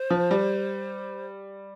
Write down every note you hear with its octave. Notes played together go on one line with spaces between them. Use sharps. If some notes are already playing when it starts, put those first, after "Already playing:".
Already playing: C5
F3
G3